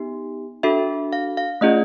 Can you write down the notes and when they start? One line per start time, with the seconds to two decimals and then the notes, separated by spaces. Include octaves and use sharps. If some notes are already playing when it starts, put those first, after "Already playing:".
Already playing: B3 D#4 G4
0.63 D4 F#4 A4 E5
1.13 F5
1.37 F5
1.61 A3 C#4 F4 G#4 D#5